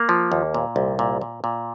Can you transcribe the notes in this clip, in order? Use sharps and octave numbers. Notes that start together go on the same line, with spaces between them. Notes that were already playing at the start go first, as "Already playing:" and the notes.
Already playing: A#3
F3
D#2
A#2
C2
A#2
A#2
A#2